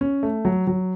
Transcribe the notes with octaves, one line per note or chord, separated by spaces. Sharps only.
C#4
A3
F#3
F#3